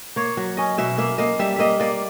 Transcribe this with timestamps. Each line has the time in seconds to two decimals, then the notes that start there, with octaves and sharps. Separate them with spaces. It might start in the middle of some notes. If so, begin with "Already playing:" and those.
0.16 A#3 C#5
0.37 F#3
0.57 C#4 D#5
0.78 B2 E5
0.98 A#3 E5
1.18 A#3 D#5
1.39 G3 E5
1.56 A#3 D#5 E5
1.80 A#3 D5